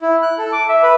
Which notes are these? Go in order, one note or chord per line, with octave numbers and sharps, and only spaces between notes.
E4
F#6
A4
D6
E5
B4